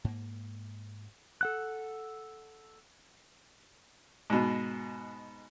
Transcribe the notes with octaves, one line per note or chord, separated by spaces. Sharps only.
G#2 A#3
A4 F#5 F#6
G#2 B2